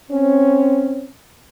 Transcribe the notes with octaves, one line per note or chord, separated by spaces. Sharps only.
C4 C#4